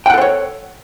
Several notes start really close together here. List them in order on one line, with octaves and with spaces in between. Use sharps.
G5 F#5 A4 C5 C#5